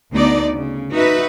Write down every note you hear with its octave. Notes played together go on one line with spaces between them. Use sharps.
D2 D3 B3 D#4 D5
C#3
D#4 F#4 B4 E5